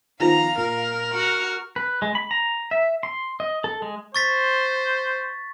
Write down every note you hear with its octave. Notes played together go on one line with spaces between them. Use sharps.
D#3 F3 B3 F5 A#5
A#2 A#4
F#4 F6
B4
G#3
B5
A#5
E5
C6
D#5
A4
G#3
C5 C#6 A6 B6